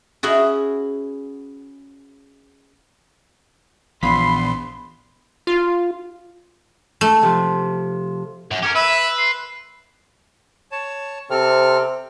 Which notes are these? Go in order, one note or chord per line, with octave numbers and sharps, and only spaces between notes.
C#4 E4 F#4 G#4
A#1 E3 B3 F5 B5 C6
F4
A3
C3 F3
F#2
C#4 G4 A#4
B4 E5
C6
C#5 A5
C3 C4 A4 F6